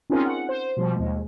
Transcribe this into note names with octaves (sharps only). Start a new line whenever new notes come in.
C4 C#4 D#4 F4 G#4 A#4
F#5
C5
B2 F3 G3
D#2 G#3